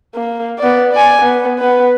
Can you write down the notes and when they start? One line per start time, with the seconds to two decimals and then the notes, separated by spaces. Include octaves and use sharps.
0.15 A#3
0.59 B3 D5
0.93 D5 G#5
1.22 B3
1.59 B3 B4